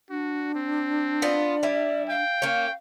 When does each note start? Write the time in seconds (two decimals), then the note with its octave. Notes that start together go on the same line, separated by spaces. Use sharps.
0.10 D4 F#4
0.55 C4
1.22 B3 F4 D5
1.63 G3 E4
2.09 F5 G5
2.42 A#3 C#4